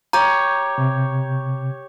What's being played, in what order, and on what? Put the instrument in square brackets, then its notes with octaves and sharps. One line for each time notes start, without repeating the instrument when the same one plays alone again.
[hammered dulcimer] G4 C#5 [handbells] A#5 G6
[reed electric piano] C3